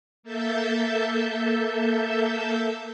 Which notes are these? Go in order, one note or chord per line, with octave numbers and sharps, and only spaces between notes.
A#3 A4 E5 A5 G6